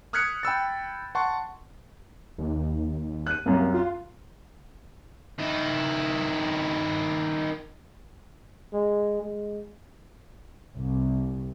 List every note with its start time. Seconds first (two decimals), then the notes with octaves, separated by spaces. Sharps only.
0.13 D#6 F6 F#6 G#6 B6 C#7
0.43 G5 B5 E6 A6
1.15 F#5 A5 C6 C#6
2.38 D#2
3.27 F#6 D#7
3.46 C2 F#2 A#3
3.74 F4
5.39 D#3 E4
8.73 G#3
9.22 G#3
10.75 C2